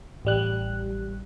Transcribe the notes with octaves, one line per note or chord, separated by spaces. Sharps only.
A1 G3 F#6